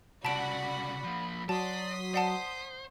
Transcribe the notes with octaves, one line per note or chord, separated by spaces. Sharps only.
C2 C#3 F#4 D5 F#5 A5 B5 D7
F3 A#3
F#3 D5 A5 C6 D#6 B6
C5 D5 F#5 A5